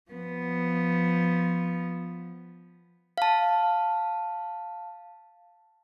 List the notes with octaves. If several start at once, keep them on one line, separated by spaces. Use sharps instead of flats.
F3 B3
F5 A5